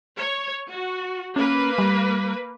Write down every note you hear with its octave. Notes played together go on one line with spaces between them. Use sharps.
C#5
F#4
A#3 C#4 B4
G3